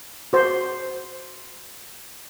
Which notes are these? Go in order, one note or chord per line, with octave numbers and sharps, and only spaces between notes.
F#4 C5